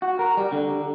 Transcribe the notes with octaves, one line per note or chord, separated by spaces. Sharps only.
F#4
A#4
G3
D3